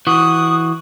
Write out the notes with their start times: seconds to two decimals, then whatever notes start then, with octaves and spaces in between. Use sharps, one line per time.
0.07 E3 F#4 D#6